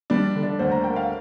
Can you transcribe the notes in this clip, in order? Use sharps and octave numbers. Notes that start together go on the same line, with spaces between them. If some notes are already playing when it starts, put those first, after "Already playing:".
G3 D4
D3
D4
D2 C5
A#5
A#3 G5
F5